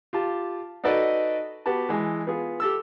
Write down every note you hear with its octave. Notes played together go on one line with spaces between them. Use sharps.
F4 G4 A5
D#4 F#4 A4 B4 D5 D#5
B3 F#4 G4 A5
E3 G#3
B3 F4 G#4
G4 A4 E6